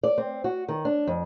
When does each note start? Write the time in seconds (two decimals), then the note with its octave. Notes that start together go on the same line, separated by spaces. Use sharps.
0.03 D5
0.18 C4
0.44 F#4
0.68 D#3
0.85 D4
1.07 F2